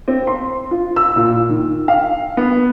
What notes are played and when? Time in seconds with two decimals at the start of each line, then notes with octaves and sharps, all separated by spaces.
0.08 C4
0.27 C6
0.71 F4
0.96 E6
1.16 A#2
1.49 D#3
1.88 F5
2.37 B3